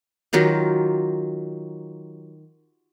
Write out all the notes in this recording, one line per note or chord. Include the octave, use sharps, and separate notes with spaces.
D#3 F#3 F4 G4